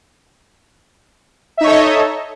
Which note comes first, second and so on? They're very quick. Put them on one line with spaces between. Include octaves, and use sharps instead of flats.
E5 D#4 C#5 A4 D#5